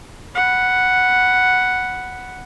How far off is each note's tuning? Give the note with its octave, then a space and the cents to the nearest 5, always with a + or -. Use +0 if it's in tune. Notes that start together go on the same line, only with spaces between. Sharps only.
F#5 +0 B5 +0